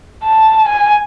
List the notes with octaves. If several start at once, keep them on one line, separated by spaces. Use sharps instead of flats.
A5
G#5